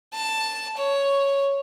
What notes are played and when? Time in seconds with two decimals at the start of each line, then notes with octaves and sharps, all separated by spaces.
0.13 A5
0.77 C#5